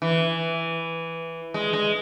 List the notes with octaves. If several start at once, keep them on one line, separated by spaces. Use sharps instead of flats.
E3
G#3
G#3